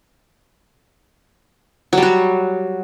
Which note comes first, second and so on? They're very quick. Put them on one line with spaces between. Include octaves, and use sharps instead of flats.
F#3 G3 F#4